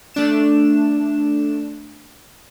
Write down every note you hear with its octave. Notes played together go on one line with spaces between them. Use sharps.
A3 D4 E7